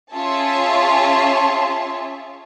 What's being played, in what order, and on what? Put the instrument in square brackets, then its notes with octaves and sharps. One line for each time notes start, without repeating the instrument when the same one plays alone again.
[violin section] C#4 F4 G#4 C#5 E5 A5